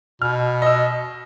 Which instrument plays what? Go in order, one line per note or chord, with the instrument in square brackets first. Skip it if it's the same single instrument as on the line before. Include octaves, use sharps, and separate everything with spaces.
[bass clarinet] B2 [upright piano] F6
[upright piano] D#5 E6